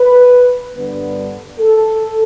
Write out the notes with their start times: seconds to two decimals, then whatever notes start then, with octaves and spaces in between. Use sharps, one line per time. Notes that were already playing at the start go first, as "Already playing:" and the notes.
Already playing: B4
0.75 G2 D3 G3 B3 D4 B4
1.59 A4